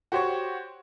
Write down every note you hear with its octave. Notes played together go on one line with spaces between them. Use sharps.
F#4 G4 C5 C#5 C#6